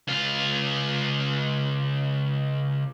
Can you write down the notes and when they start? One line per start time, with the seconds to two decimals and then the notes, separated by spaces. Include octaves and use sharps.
0.08 C#2 F4